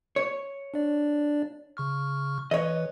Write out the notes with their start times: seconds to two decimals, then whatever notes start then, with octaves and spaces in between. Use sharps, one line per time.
0.16 C#5
0.74 D4 D5
1.77 C#3 C#6 F6
2.51 E3 B4 C#5 D#5